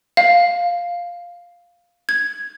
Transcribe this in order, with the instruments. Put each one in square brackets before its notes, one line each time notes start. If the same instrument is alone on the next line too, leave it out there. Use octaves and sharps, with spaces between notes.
[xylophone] F5
G#6